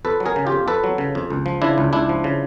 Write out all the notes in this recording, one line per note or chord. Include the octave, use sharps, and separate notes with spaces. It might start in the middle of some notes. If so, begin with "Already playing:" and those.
F2 A4 B4
F#3
G#4 A#4
C#3
F4 G4
F2
F2 A4 B4
F#3
C#3
F2
C#2
F3
C#3 D4 E4
C#2
C#2 D4 E4
F3
C#3